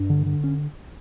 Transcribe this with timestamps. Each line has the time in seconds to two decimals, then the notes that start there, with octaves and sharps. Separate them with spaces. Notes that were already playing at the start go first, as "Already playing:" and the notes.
Already playing: G2 D4
0.10 D3
0.26 D3
0.44 C#4